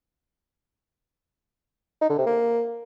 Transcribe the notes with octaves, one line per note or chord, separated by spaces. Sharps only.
D#4
D3
C3
A#3